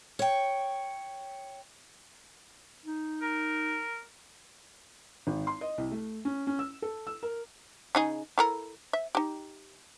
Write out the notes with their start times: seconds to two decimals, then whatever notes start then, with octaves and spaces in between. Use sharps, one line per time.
0.19 C#5 G5
2.86 D#4
3.22 A#4
5.27 G#1
5.47 C6
5.61 D#5
5.78 C2
5.91 A3
6.25 C#4
6.47 C#4
6.59 E6
6.82 A4
7.07 E6
7.23 A#4
7.95 C#3 D#4 G#4
8.38 E4 A4 A#4
8.93 E5
9.15 D#4 G4